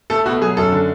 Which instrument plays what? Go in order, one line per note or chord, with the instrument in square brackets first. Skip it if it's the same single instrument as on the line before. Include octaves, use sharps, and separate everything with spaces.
[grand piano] A3 A4
B2 F#4
F#3 G#4
F#2 A4
D3